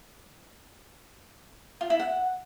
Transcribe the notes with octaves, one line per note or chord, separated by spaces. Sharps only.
F4
E4
F#5